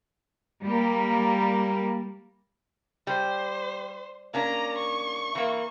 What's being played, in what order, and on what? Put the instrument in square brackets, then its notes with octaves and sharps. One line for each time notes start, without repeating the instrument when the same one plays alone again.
[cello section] G3 A#3
[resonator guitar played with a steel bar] G3 [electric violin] C5
[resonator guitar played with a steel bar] A#3 C#4 D4 [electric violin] A#5
[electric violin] C#6
[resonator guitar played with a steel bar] E3 A#3